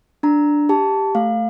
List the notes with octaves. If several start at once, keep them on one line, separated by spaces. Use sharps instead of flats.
D4 A#5
G4 A5
A3 F5